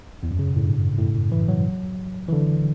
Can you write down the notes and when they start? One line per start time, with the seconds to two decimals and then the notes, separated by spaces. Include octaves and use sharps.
0.23 E2
0.31 F#2
0.39 C#3
0.47 B2
0.56 A2
0.64 G2
0.98 A2
1.32 E3
1.48 F#3
2.29 E3
2.33 D3